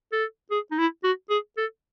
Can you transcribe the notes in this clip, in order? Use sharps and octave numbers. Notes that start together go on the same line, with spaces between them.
A4
G#4
D#4
E4
F#4
G#4
A4